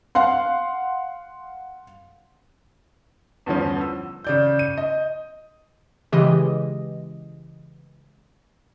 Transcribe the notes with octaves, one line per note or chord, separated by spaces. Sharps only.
F5 F#5 C6
E2 G2 D3 F3 C#4
E6
C#3 D5 G6
D#7
D#5
C#3 E3 G#3 G4 D#5